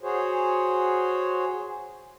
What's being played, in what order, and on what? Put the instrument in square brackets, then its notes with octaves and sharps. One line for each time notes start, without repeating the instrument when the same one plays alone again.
[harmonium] F#4 G#4 C5 C#5